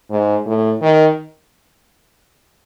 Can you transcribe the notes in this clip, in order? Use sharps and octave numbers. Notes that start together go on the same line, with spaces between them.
G#2
A2
D#3